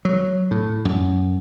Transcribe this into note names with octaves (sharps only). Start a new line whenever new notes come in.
F#3
A2
F#2